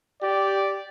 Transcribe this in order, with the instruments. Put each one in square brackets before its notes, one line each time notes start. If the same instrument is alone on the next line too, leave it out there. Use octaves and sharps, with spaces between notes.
[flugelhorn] G4 [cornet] D5